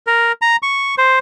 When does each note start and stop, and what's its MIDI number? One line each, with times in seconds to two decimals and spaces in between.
0.07 0.32 70
0.42 0.56 82
0.63 0.95 85
0.98 1.19 72